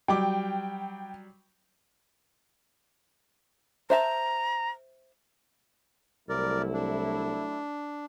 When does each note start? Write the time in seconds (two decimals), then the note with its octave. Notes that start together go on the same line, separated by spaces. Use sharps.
0.08 F#3 G3 G5 D6
3.90 C5 E5 A5 A#5
6.29 C2 F#3 A3 E4 A#4 D5
6.73 D4